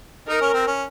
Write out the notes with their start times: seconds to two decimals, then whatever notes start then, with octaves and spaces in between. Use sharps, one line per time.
0.28 D#4 A#4
0.41 C#4
0.54 C4
0.67 C#4